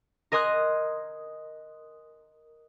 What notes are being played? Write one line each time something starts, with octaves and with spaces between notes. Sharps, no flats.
A#4 D#5 G#5 C6 D#6 F#6